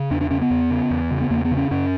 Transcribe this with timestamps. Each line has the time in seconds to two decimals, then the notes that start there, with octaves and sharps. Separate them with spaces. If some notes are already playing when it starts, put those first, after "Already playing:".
Already playing: C#3
0.11 E2 D4
0.21 D4
0.31 C#3 C#4
0.41 B3
0.50 E2
0.70 C#3
0.90 E2
1.11 C#3
1.21 B3
1.30 E2 A#3
1.45 B3
1.51 C#3
1.57 C#4
1.71 F#2 C#4